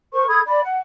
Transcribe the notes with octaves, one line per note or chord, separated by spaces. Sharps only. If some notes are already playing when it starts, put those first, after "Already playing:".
A#4 C5 C#6
A4 B5 D#6 G#6
D5 B5
F#5